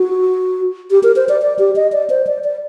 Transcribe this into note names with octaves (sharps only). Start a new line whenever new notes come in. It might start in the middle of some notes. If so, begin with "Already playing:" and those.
Already playing: F#4
G4
A#4
C5
D5
D5
G4
D#5
D5
C5
D5
D5